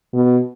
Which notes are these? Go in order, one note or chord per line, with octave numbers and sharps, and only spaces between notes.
B2